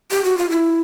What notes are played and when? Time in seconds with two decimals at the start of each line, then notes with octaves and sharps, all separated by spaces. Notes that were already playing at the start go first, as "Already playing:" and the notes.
0.11 G4
0.24 F#4
0.38 F4
0.50 E4